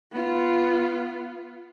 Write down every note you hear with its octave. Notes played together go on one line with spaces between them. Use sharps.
B3 F4